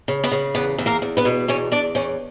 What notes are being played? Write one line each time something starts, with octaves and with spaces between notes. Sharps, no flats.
C#3
B3 B4
C#3
E2 B3 B4
E2
A#3 A#4
E2
B3 B4
B2
E2 C#4 C#5
E2 D4 D5
E2 C#4 C#5